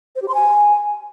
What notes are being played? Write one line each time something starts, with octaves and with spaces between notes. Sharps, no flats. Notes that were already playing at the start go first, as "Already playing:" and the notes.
C5
G4
C6
G#5